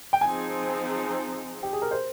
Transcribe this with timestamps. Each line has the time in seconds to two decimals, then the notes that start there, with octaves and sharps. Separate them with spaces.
0.13 G5
0.21 F3 C4 D#4 G#4 G#5
1.63 G4
1.73 G#4
1.82 A#4
1.91 C5